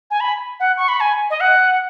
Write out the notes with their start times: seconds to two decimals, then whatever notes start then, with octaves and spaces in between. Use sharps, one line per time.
0.10 G#5
0.20 B5
0.60 F#5
0.77 C#6
0.88 B5
1.00 G#5
1.30 D#5
1.40 F#5